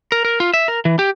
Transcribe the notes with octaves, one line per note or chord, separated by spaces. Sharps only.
A#4
A#4
F4
E5
A#4
E3
G4